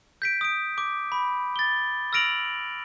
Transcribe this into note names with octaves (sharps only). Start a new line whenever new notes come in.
G6 B6 D7
D#6 D7
D6
B5
A6 G7
E6 F6 A#6 D7 F7 F#7